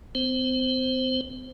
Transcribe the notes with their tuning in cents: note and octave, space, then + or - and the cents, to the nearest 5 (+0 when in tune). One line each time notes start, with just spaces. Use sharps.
C4 -45 C5 +5